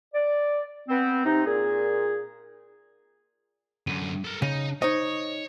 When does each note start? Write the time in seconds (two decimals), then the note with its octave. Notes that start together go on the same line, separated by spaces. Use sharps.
0.14 D5
0.89 B3 C4
1.25 C3 D#4
1.46 A#2 G#4
3.87 F#2 D3 D#7
4.25 A4 A#4
4.42 C#3 D#4
4.82 D#4 C5 C#5 D#5